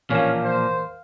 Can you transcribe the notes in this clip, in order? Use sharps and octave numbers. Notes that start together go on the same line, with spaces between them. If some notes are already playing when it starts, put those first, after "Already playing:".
A1 A#2 E3 F3 C#4 A#4 F5
C5